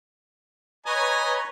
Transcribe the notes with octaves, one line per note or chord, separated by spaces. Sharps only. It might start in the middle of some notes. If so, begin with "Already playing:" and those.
B4 C#5 D#5 G#5 A#5